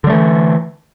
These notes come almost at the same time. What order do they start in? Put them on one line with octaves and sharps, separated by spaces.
D3 G3 A3 E3